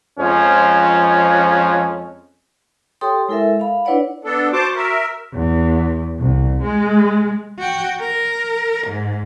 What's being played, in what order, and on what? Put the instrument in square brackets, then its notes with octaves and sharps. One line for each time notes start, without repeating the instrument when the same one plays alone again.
[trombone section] F2 F3 G#3 C#4
[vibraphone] G4 A4 C#5 G5 C6 D#6
G#3 E4 A4 A#4 E5
F5 B5
D4 E4 B4 C#5 D5 F#5
[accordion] B3 D4 A4
[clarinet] F#4 [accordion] C5 A5 D6
[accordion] A#4 E5
[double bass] E2
C2
G#3
[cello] F#4 G5
A#4
G#2